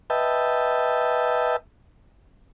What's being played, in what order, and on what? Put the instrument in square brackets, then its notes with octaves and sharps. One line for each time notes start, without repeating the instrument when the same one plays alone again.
[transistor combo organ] B4 D#5 E5 G5 A5